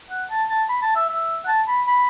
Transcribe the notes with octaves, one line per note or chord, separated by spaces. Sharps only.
F#5
A5
A5
B5
A5
E5
E5
F#5
A5
B5
B5